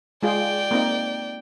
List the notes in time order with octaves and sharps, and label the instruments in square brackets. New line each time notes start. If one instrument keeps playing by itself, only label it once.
[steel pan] G#3 F4 G#4 [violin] D5 G5
[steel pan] A#3 C4 D#4